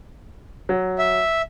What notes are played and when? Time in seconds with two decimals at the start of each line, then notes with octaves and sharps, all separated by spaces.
0.69 F#3
0.98 E5